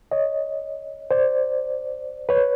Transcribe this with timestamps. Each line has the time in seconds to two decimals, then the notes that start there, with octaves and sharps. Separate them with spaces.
0.11 C#5 D#5
1.11 C5 D5
2.29 B4 C#5